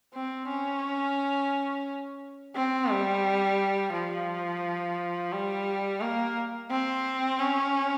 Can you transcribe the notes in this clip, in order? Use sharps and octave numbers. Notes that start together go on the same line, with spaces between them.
C4
C#4
C4
G3
F3
G3
A#3
C4
C#4